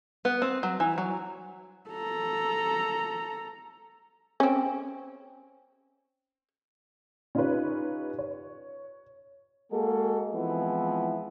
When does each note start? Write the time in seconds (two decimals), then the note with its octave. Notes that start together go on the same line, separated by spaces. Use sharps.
0.25 B3
0.42 C4
0.63 F#3
0.80 E3
0.98 F#3
1.90 A4 A#5
4.40 C4 C#4
7.35 C#4 D#4 F4 G4 B4 C#5
8.19 C#5
9.72 G#3 A#3 F#4 G#4 A4
10.35 E3 F3 G#3 B3 C4 E4